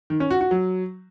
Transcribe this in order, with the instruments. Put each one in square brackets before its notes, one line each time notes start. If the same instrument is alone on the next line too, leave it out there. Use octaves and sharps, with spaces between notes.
[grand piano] D#3
C#4
F#4
F#4
F#3